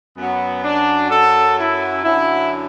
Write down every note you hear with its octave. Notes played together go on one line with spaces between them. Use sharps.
F#2 F#3 B3
D4
A4
E4
F#2 D3 F#3 E4